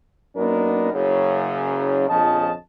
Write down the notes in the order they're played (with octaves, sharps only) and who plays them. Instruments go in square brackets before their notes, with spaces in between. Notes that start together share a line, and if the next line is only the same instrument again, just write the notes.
[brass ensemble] F#2 A#3 B3 D4 D#4 A#4
F#1 F#2 C#3
A#1 F2 C#3 D#5 A5